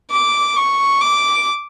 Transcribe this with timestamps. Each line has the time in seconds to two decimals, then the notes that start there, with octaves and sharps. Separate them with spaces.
0.11 D6
0.56 C#6
1.01 D6